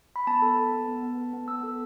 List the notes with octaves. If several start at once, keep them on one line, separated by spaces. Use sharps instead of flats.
B5
B3 A5
A4
A4
B3
B3
B3
A4
B3
B3 E6
A4